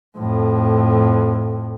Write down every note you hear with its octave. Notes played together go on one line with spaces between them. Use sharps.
F2 A2